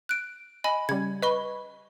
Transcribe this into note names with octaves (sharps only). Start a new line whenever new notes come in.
F#6 D7
D#5 G#5 B5
C#3 G3 G#6
B4 D#5 C#6 G7